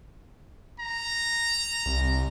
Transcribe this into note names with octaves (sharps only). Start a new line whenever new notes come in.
A#5
C2